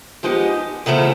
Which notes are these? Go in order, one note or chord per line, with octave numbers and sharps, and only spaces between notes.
F3 G#3 B3 D#4 G4
E2 C#3 F3 A3 C#4